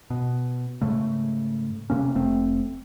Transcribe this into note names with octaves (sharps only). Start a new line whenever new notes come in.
B2
G#2 C#3 A3
C3 A#3 C#4
F1 A3 C4